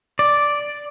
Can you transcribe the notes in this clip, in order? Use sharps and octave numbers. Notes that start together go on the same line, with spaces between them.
D5